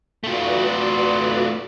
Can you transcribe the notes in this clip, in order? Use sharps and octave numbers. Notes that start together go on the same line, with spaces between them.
A3 F4 F#4 B4 D5